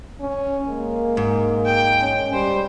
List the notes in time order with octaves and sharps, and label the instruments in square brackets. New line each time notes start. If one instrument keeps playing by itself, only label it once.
[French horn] C#4
[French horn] G#3 [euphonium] A#3
[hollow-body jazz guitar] G#2
[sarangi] G5
[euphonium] C#4
[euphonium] G3 [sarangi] C5